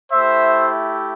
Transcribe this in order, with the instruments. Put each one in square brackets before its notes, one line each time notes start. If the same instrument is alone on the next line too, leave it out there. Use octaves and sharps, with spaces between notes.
[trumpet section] A3 E4 G4 C5 E5